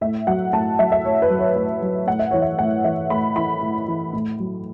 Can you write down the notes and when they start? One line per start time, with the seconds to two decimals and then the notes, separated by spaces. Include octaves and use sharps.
0.01 A2 E5
0.27 F#3 F#5
0.53 A2 A5
0.79 F#3 E5
0.92 E5
1.04 A2 C#5
1.22 B4
1.30 F#3
1.39 C#5
1.56 A2 B4
1.82 F#3
2.07 A2 F#5
2.19 E5
2.31 E3 C#5
2.42 E5
2.59 A2 F#5
2.84 E3 E5
3.10 A2 B5
3.36 E3 B5
3.63 A2
3.88 E3
4.13 A2
4.40 F#3